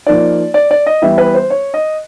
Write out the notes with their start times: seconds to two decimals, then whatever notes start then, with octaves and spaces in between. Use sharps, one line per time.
0.06 F3 A#3 D#4 D5
0.54 D5
0.71 D5
0.86 D#5
1.02 E3 G3 B3 E5
1.18 B4
1.34 C5
1.50 C#5
1.74 D#5